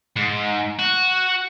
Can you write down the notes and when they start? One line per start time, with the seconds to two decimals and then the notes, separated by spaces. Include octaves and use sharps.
0.16 G#2
0.79 F#4